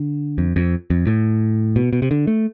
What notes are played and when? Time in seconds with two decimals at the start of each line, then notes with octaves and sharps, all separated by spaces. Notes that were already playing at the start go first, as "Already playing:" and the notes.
Already playing: D3
0.38 F2
0.56 F2
0.90 F2
1.07 A2
1.76 B2
1.93 B2
2.02 C3
2.11 D3
2.27 A3